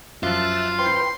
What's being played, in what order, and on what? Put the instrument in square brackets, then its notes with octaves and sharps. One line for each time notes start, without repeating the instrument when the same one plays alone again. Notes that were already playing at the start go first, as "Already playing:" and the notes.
[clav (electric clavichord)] F#2 F3 [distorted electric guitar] F4 [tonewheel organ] E5 F#6 A6
[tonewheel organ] B4 C5 G5 [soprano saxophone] C6